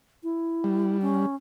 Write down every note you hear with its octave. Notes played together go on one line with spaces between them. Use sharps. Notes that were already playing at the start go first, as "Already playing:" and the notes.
E4
G3
C#4